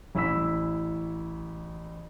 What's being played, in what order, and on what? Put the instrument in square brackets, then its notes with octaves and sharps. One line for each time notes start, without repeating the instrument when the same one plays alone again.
[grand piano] A1 E4 B5 E6 B6